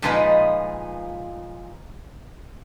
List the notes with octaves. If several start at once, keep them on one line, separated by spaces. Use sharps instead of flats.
A#2 F3 G#3 D#4 B4 D#5